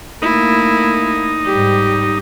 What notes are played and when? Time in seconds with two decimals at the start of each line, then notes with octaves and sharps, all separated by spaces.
0.22 A3 A#3 D#4 E4
1.46 G#2 G3 G4